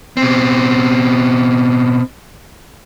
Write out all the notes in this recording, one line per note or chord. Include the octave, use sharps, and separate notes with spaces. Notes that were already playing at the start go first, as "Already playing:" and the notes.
B2 C4